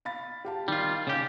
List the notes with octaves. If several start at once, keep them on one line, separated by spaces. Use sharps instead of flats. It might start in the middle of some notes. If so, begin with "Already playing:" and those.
F5 B5 A6
G4 F5 A5
D#3 G3 F4
C#3 G4